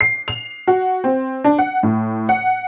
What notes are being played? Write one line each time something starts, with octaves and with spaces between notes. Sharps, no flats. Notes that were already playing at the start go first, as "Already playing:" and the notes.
C7
F7
F#4
C4
D4
F#5
A2
F#5